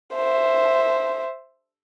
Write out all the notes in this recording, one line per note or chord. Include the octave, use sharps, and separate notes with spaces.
C5 E5